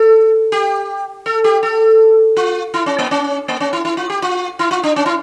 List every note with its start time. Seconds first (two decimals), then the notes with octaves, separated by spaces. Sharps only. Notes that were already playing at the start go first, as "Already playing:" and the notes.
Already playing: A4
0.52 G4
1.26 A4
1.44 G4
1.63 A4
2.37 F4
2.74 E4
2.86 C#4
2.98 A#3
3.11 C#4
3.48 A#3
3.60 C#4
3.73 E4
3.85 E4
3.97 F4
4.10 G4
4.22 F4
4.59 E4
4.71 F4
4.84 D4
4.96 C#4
5.06 E4